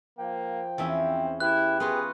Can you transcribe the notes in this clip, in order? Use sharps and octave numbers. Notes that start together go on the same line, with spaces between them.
F3 A#3 G5
E2 C4 C#4 E5
E4 G4 B4 F#6
B3 F4 F#4 G#4